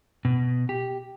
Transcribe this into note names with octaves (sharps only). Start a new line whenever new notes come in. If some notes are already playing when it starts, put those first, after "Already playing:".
B2
G4